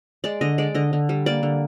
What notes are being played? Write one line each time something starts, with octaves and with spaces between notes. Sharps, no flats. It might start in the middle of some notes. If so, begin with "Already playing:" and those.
G#3 D5
D3 D#5
G#3 D5
D3 D#5
D3
G3
A#3 D5
D3